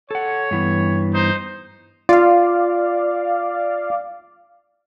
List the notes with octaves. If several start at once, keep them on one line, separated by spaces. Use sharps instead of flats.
A4 C#5 F#5
G2 E3 B3
D#4 C5
F4 D5 F5